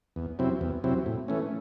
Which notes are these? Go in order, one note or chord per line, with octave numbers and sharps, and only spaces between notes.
E2
C3 F#3 C4 E4
E2
C3 F#3 C4 E4
A2
E3 A3 C#4